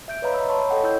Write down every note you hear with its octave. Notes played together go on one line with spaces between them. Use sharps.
E5 G6 D7
B4 C#5 D#5 F5 A#5 B5
E6
C#5 A5 B5 C6
A4 C#5 D#5 F#5 G5
E4 E6 G6